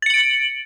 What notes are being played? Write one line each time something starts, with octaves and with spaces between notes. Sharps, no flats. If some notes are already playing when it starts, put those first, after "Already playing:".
A6 C#7 D7 F#7